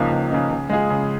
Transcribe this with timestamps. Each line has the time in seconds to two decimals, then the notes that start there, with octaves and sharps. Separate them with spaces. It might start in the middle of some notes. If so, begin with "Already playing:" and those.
Already playing: C#2 C#3 F3 A#3 D#4
0.12 C#2
0.31 C#3 F3 A#3 D#4
0.51 C#3
0.70 G#3 F4 G#4
0.90 C#3